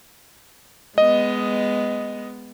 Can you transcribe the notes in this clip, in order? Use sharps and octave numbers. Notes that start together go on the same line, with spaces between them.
G#3 B3 D#5